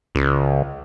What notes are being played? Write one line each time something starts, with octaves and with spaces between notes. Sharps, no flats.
C#2